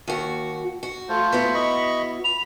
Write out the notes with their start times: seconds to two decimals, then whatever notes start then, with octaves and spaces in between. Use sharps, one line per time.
0.08 D#2 F#4
0.83 F#4
1.09 A3 F4 C5
1.32 B3 E4 F#4
1.54 D#5 B5 C#6
2.24 B5 F7